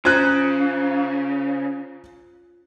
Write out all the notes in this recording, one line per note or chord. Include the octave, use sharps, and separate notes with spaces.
C#3 F4 C5 A#5 F#6 G#6 D#7